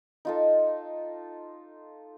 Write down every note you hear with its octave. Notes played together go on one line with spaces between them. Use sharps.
D#4 F4 A4